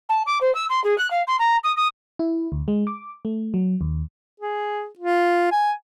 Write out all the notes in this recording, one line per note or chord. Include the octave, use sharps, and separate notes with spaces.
A5
D6
C5
E6
C6
G#4
F#6
F5
C6
A#5
D#6
D#6
E4
D2
G#3
D6
A3
F#3
D#2
G#4
F4
G#5